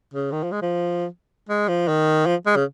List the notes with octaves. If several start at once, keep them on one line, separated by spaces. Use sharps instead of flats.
C#3
D#3
F3
G#3
F3
G#3
F3
D#3
F3
G#3
C#3